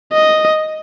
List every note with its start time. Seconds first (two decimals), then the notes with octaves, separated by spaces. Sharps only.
0.13 D#5